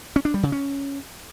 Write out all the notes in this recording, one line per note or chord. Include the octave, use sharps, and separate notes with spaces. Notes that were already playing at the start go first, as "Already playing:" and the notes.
C#4
D4
G3
C#3
C#4